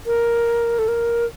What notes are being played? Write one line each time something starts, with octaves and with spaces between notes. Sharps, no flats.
A#4
A4
A#4